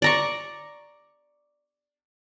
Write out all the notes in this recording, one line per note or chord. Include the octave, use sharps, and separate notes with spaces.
D5 A#5 C#6